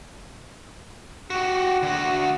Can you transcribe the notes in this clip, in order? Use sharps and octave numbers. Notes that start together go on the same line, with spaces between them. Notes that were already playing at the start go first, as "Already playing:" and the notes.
F#4 G4
D3 F#4